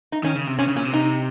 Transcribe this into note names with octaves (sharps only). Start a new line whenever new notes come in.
D#4
D#3 C#4
C#3
C3
C3 C#4
C#3
A#2 C#4
C3
D#4